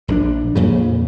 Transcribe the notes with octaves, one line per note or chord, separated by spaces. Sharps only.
A#1 E3 D4
F2 A#2 C#3